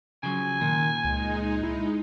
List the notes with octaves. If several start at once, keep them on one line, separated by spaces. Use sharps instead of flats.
C#3 F3 F#3 G#5
A#2 D#3
C#2 G#3 D#4
E4